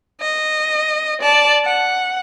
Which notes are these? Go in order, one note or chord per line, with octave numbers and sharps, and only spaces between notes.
D#5
D5 A5
F#5